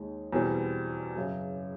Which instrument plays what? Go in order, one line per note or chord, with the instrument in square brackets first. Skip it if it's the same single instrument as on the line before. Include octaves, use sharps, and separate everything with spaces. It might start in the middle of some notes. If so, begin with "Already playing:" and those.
Already playing: [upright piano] D#2 D#3 G#3
E2 B2 G3 C4
F#2 C#3 F#3